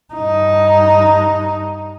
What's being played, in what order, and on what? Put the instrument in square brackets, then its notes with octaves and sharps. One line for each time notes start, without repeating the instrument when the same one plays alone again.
[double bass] G2 D#4